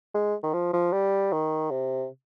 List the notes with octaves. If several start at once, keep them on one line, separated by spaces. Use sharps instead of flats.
G#3
D#3
F3
F3
G3
D#3
C3